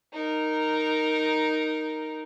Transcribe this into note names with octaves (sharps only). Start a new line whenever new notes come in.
D#4 A#4